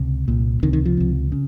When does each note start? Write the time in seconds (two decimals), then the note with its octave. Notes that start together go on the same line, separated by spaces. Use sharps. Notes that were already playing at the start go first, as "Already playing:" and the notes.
Already playing: C#2 C3
0.28 C2 A#2
0.63 C#2 C3 D#3
0.73 D#3
0.86 F3
0.97 C#2 C3
1.32 C#3